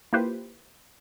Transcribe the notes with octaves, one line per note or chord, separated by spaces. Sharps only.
A#3 E4 F4 G4 B4 C5